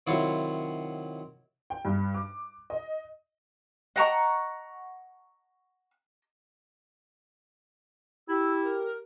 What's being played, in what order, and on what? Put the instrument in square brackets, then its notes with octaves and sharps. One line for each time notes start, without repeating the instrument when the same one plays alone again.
[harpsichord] C3 D#3 F#3 E4 F4
[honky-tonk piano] G5
G2
D6
D#5
[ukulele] D#5 G5 A5 [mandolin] F#5 A#5 C#6
[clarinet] E4 [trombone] G4 [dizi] E6
[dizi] A#4